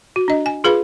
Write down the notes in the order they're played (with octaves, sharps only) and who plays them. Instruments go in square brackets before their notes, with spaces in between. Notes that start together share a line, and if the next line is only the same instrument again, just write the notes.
[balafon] F#4
D4 D#5
G#5
F4 G#4 B4 F5 B5